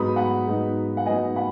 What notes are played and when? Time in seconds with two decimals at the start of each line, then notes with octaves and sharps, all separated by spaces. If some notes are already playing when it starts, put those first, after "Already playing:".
Already playing: G#2 F#3 B3 D#4 B5 D#6
0.16 F#5 B5
0.47 G#2 F#3 B3 D#4
0.97 F#5
1.06 G#2 F#3 B3 D#4 D#5 G#5
1.36 F#5 B5